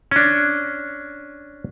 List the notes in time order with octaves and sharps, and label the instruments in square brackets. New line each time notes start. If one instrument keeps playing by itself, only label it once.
[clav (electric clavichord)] C#4 D4